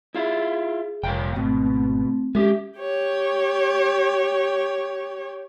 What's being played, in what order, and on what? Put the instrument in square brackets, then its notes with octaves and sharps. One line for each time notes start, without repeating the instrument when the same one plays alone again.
[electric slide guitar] E4 F4 E5 [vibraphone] G#4
[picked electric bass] F1 [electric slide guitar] A#2 F5 G5
[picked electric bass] G#1 [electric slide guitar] B2 [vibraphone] A3 C4
[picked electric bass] G#3 C#4 [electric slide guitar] G4 G#4 [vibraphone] E5
[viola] G4 C#5